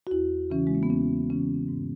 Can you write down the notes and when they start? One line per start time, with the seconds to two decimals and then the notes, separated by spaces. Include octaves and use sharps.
0.07 F#4
0.11 E2 E4
0.50 C#3 E3 C#4
0.67 G#3
0.75 A#3
0.83 B3
0.90 E2 C#4
1.30 C#3 E3 C#4
1.68 G#2